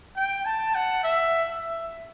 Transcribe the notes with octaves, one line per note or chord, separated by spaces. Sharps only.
G5
A5
F#5
E5
E5